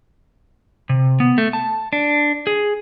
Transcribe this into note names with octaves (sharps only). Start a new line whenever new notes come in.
C3
B3
A3
A5
D4
G#4